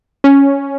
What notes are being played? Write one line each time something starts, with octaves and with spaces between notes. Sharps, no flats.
C#4